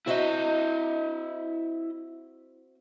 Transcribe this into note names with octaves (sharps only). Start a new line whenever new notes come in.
C4 E4 F#4 D#5 E5